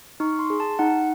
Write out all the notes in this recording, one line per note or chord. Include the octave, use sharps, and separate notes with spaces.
D#4 C#6
C6
G#4
A5
D#4 F#5